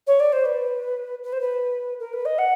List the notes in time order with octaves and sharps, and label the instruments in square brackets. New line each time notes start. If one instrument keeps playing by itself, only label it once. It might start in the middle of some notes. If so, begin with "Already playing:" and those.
[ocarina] C#5
D5
C5
B4
B4
C5
B4
A#4
B4
D#5
F#5